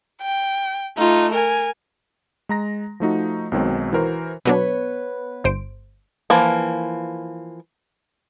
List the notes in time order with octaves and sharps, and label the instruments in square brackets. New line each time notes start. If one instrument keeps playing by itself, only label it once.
[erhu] G5
[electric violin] A3 F4 [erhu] D#4
[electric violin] A#4 [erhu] G#5
[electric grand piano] G#3 A#5 A#6
F3 A3 D#4 F#4
B1 B2 D#3 F#3 G#3 C4
E3 F#4 A#4 C5
[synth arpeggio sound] B2 F#3 D4 [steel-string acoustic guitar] B3 B4 C#5
[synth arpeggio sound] G1 C5 D7
[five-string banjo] E3 F3 A#3